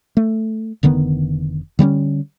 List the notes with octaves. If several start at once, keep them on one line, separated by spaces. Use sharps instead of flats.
A3
F1 D3 D#3 B3
D3 G3 A#3 C#4